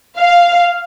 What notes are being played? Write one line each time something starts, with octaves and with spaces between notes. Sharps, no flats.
F5